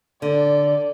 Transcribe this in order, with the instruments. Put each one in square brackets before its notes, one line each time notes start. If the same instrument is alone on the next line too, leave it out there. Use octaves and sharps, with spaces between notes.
[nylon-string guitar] D3 [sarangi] D5